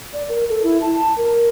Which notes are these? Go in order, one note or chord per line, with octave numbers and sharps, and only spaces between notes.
D5
A#4
A4
E4
A5
A#4